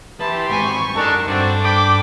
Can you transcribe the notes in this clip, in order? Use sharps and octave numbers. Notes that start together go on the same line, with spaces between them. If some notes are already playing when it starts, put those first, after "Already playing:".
E4 G4 B4 A5 B5 C6
G#2 C4 G#5 C#6
F#2 D4 D#4 A4 A#4
G2 C4 D4 F#4 A4 D5
G5 B5 D6